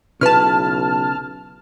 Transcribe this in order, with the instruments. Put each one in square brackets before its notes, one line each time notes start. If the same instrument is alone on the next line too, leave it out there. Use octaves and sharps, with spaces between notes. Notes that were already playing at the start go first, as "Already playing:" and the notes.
[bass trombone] B1 [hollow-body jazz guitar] C#3 E4 B4 [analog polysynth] A5 F6